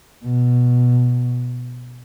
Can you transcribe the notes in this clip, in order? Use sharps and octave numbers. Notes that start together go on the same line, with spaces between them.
B2